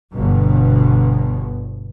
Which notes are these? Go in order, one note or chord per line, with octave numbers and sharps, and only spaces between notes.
G1 B2